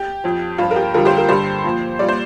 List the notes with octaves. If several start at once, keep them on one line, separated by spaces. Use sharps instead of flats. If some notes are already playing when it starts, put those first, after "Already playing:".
Already playing: G4
F2 F3
G2 F3 F4
A#4
G4
F2 D3 G3 F4 A#4
G4 C5
F4 A#4
G2 D3 G3 G4 C5
A#2 F3
A#2 G3 D5
C5